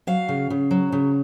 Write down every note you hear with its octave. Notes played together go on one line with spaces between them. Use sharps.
F#3 F5
C#3
C#3
F#3
C#3